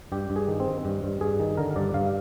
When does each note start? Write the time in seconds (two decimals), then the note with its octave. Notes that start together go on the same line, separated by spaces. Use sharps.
0.12 G2 G4
0.30 G2
0.36 G#4
0.48 D#3
0.60 C4
0.67 D#3
0.85 G2
1.03 G2
1.21 G2 G#4
1.40 D#3
1.57 D3 A#4
1.76 G2 D5
1.94 G2 F5